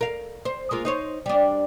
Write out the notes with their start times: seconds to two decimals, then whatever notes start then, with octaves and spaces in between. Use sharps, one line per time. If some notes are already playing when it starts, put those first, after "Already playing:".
0.01 A#4 F5
0.45 C5
0.71 G#3 A#3 F4
0.85 D#4 C5 C#5
1.26 G3 D4